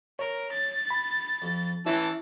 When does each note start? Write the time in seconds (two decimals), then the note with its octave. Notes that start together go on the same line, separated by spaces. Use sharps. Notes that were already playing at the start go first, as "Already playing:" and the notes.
0.19 A#4 C#5
0.52 A6
0.90 B5
1.42 F2
1.86 E3 C#4 E4 A5